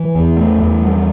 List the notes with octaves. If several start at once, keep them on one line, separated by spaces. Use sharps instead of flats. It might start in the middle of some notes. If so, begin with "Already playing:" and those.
Already playing: E3
E2
A3
E2
G3